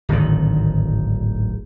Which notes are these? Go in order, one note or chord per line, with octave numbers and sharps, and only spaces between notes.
D1 G#1 D2 D#3